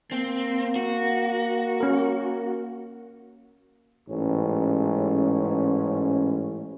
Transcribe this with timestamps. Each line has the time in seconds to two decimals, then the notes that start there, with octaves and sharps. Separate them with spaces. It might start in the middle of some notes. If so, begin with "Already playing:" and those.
0.12 A#3 C4
0.76 F#4
1.80 C#4 A#4
4.09 A1 G#2 C#4